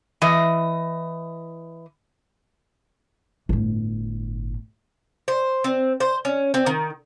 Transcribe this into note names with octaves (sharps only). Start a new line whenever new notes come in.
E3 D#5
G1 A2
C5
C4
C5
C#4
C4
D#3